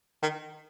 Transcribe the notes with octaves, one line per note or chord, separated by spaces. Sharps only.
D#3